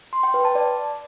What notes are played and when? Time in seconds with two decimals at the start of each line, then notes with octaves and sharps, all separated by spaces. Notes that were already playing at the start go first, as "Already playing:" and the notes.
0.13 C6
0.23 G5
0.34 B4
0.45 A5
0.55 D5